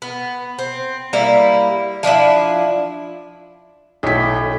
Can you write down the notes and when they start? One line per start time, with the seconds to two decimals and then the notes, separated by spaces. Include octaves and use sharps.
0.02 B3
0.59 C4
1.13 G3 A#3 E4
2.03 F3 D4 E4 E5
4.03 B1 A2 B6